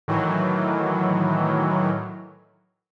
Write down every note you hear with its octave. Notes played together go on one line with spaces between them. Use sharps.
A2 D#3 E3 F#3